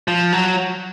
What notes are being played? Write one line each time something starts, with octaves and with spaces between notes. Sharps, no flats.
F3
F#3